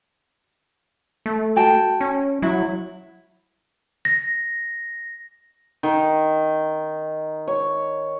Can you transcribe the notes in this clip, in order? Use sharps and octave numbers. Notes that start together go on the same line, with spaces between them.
A3
F#4 G5 A5
C#4
F#3 E4
A#6
D#3
C#5